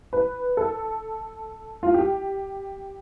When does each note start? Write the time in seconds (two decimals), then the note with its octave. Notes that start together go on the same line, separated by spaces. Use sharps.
0.13 B4
0.57 A4
1.83 F4
1.94 G4